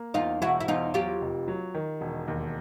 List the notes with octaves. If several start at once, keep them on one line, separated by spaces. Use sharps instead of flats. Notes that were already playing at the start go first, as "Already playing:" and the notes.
Already playing: A#3
E2 D#4 F4
E1 E4 F#4
E4
E2 D#4 F4
F#3 F4 G4
F1
F#3
D#3
E1
D#2